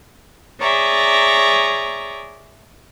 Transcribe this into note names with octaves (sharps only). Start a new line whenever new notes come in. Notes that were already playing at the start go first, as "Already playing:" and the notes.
G#4 C#5 D5 E5 A#5